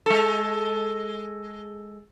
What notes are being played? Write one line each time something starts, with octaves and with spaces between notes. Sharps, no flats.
G#3 A4